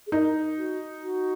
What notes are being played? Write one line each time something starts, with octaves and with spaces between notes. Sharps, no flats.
G#4
D#4 A#4
F#4
F#4